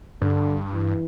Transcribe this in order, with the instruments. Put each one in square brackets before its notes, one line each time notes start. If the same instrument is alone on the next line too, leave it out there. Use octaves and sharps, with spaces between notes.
[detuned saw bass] G2 [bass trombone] D3
[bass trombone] E3